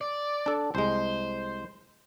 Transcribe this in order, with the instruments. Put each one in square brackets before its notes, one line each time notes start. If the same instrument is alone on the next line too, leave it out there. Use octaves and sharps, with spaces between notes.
[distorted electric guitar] D5
[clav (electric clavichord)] D4 A4
[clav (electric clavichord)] C2 G#3 [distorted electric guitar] C5